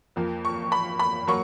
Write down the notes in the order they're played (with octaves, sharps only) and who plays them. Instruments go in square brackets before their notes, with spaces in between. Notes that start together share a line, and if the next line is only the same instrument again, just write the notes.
[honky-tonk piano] F2 F3 A#3
C#6
B5
B5
F#3 A#3 C#6